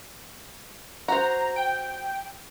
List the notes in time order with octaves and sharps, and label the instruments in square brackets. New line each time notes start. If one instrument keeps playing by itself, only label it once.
[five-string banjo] F#4 C5 [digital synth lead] A#5
[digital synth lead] G5